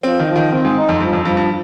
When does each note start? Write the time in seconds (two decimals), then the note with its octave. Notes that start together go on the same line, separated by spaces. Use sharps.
0.03 F3 C4
0.19 D#3
0.28 F3
0.36 D#3
0.52 D#3 C4
0.65 G#2
0.77 D#4
0.89 F2
1.00 G2 F3
1.13 F2
1.25 G2 F3
1.37 G2